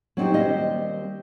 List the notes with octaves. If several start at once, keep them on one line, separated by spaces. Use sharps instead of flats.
F#3 C4 D4 D#4 G4
D#2 G3 C4 D#5